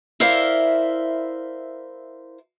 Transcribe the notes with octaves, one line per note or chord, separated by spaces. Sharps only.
E4 A#4 C5 D5 E5 F5